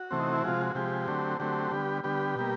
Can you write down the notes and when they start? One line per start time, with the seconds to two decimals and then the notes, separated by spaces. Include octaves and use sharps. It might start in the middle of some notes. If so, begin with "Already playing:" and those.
Already playing: F#4
0.11 C3 E3 A3 C4
0.20 D#4
0.33 E4
0.44 C3 F3 G#3 F4
0.61 F#4
0.75 C3 F3 G#3 G4
1.07 D3 F#3 A3 C4
1.39 D3 F#3 A3 C4 G4
1.71 D3 G3 B3
2.04 D3 G3 B3 G4
2.36 B2 G3 A#3